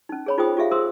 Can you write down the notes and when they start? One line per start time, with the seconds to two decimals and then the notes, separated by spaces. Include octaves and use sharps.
0.09 C#4 D#4
0.26 G#4 C#5 B5
0.38 D#4 F4 G#4 C5 G5 D#6
0.57 F4 G4 G#4 E5 F5
0.71 G#4 A#4 C5 C6 D#6 E6